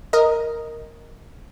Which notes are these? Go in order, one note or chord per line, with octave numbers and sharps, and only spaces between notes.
A#4 D#5